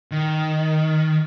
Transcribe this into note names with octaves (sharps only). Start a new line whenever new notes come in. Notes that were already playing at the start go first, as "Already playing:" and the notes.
D#3